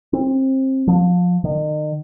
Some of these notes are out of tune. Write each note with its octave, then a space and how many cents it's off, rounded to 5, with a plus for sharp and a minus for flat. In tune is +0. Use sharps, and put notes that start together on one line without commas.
C4 +25
F3 +25
D#3 -35